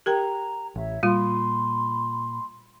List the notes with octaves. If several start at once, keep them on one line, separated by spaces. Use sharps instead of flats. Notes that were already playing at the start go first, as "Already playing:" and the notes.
G4 A#4 G5 A#5
A1 E4 C#5 E5
A#2 G3 F4 B5 C6